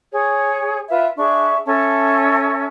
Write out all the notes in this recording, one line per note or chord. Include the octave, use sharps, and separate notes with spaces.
G#4 C#5
F4 B4 E5
D4 G#4 E5 C#6
C#4 A4 E5 A5